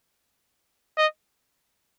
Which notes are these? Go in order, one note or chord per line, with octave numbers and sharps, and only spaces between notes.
D#5